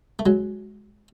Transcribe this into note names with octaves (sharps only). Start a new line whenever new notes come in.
A3
F#3 G#3